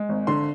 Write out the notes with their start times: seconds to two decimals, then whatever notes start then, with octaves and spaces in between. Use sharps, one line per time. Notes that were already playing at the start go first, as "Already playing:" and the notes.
Already playing: G#3
0.09 G#1
0.27 D3 C6